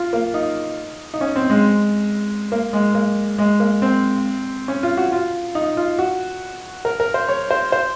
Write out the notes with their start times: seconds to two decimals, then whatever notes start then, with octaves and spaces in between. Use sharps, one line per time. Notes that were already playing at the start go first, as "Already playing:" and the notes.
Already playing: F4
0.13 A#3
0.34 D#4
1.14 D#4
1.21 C#4
1.36 C4
1.50 G#3
2.52 A#3
2.73 G#3
2.94 A#3
3.38 G#3
3.60 A#3
3.82 C4
4.68 C#4
4.83 F4
4.97 F#4
5.12 F4
5.55 D#4
5.77 F4
5.99 F#4
6.85 A#4
7.00 A#4
7.14 C5
7.29 C#5
7.51 C5
7.72 C5